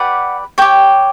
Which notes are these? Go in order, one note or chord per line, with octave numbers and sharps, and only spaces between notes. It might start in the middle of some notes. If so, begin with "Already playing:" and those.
Already playing: G4 B4 D5 F#5
G4 C#5 G5